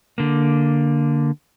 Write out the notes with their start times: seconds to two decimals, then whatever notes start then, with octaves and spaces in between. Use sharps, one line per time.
0.18 D3 A#3